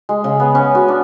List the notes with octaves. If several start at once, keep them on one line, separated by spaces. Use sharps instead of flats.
G#3
C#3
B3
C#4
F#4
D4